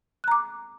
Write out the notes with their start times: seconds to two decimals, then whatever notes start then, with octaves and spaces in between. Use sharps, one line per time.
0.24 F#6
0.28 A#5
0.32 D6